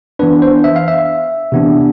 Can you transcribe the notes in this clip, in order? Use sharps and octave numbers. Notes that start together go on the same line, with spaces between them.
E3 B3 D4 B4
C5
E5
F5
E5
C3 E3 B3 D4